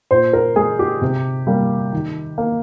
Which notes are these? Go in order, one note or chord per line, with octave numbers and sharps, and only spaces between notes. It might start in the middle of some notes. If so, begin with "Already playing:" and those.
A#2 C5
A#4
G#3 G#4
G4
C3
G3 A#3
D#3
A#3